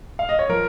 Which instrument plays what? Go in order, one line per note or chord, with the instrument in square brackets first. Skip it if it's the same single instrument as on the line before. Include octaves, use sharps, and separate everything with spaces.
[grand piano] F5
D#5
C#5
F3 A#4